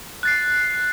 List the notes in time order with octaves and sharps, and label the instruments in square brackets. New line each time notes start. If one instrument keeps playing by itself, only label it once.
[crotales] F#6 A6 C7